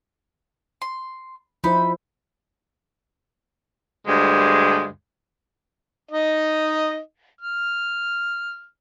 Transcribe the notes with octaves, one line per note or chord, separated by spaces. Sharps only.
C6
F3 D#4 E4 C5 B5
D2 G2 G#3
D#4 D#5
F6